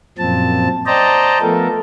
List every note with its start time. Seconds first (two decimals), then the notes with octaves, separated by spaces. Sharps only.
0.18 F#2 A#2 F3 C4 A5
0.86 C5 D5 D#5 G5 A5 A#5
1.41 F3 A3 B3 A4 A#4